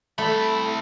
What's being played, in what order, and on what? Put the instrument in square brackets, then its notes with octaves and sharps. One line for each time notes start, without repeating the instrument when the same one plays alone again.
[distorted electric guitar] C3 B5 [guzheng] A3